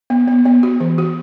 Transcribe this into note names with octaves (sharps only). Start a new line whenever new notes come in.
B3
B3
B3
F#4
E3
F#4